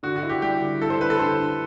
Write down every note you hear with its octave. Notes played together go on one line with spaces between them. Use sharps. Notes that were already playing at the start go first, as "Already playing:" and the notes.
D3 F#4
F#4
E4
G4
G3 G4
D3
E4 A4
C5
D3 B4
A4
D3 C5
D3